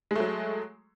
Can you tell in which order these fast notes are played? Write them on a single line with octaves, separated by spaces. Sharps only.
G#3 A3 F#3